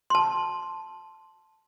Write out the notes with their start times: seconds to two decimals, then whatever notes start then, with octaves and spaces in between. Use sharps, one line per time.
0.10 A5 C6